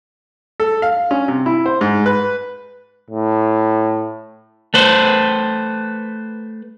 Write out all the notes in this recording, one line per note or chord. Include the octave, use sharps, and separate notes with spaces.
A4
F5
C#4
C3
E4
C5
G#2
B4
A2
A3 B4 C5